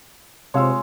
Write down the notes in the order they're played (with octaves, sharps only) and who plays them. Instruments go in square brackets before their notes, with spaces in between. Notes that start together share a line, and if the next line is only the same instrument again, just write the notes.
[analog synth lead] C3 [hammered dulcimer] G#3 F4 [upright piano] C#5 F5 E6